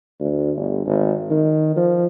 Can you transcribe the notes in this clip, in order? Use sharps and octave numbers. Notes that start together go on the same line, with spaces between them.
D2
G1
G#1
D#3
F3